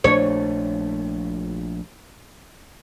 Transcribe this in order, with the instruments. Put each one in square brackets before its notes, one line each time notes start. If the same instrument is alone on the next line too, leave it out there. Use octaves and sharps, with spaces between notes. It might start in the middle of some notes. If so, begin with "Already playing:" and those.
[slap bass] A#1 A3 D4 [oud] C#5